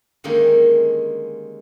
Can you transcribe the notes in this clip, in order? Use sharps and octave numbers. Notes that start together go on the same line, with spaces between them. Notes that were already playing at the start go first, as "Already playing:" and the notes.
D3 D#3 G3 G#3 A#3 C#4